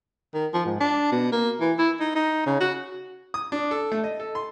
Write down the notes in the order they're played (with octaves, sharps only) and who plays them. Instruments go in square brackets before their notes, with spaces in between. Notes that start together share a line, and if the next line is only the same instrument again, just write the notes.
[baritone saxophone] D#3
F3
G#2
D4
B2
A#3
E3
E4
D#4
D#4
C#3
F#4
[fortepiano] D#6
D4
A4
A3
D#5
A4
C6